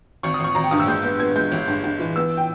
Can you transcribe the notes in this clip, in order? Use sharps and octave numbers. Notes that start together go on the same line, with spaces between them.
G#1 C#6
D#6
G#1 C#6
G#1 A#5
G5
G2 D#6
E6
G#3 G6
B3 G6
B3 G#6
G#3 G6
G1
G2
G2
E3
B3 E6
G5